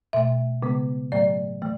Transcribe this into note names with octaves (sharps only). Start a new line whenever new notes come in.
B2 A3 E5
C#3 G#3 B3
A2 F#3 A3 D5
E3 A3